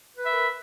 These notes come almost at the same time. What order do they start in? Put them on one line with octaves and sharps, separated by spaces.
B4 B5 E5 A#4